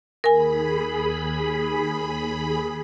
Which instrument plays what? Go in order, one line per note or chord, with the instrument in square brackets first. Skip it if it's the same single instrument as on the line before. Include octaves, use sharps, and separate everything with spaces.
[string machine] D#2 G#4 B5 [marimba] A#4 G#5